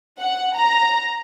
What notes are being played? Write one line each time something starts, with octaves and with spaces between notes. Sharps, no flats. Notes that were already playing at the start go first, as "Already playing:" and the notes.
F#5
A#5